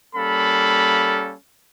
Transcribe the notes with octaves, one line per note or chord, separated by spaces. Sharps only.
G3 A#3 C#4 A4 F5 B5